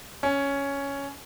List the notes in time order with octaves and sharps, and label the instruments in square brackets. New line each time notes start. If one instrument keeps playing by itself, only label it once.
[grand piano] C#4